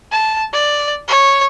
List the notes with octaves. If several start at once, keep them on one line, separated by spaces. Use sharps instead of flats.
A5
D5
C#5